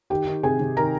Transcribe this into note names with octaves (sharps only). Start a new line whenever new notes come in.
D#3 G4 G5
D#3
C3 G#4 G#5
C3
D#3 A#4 A#5